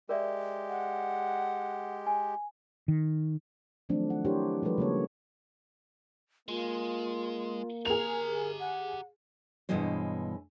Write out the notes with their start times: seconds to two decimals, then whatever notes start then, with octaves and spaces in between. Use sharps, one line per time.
0.09 G#3 G4 A#4 D5 E5
0.68 F#5
2.07 G#5
2.88 D#3
3.89 D#3 F3 F#3 A3 C4 D4
4.10 F#5
4.25 D4 E4 G4 A#4 C5 C#5
4.63 F3 G3 G#3 A4 B4
4.78 C#3 G3 A#3 C#5
6.48 G#3 A#3 F4
7.85 G4 G#4 A#4 A#5 F7
8.60 F#5
9.69 G2 B2 E3 G#3 C#4 C5